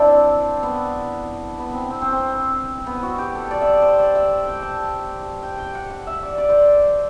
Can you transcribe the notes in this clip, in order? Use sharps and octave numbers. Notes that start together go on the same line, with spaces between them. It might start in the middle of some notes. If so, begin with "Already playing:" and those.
Already playing: C4 D4 E4 C5 D5
B3
B3
C4
C4
C4
C4
B3
F#4
G4
A4
D5
E5
D5
C5
D5
E5
G5
A5
G5
G5
F#5
F#5
E5
D5
D5
C5